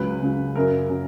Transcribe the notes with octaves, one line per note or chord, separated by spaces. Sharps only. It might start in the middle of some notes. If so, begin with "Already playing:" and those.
Already playing: C#2 C#3 F#3 B4
C#2 C#3 F#3
F#2 C#3 F#3 A#4
C#3 F#3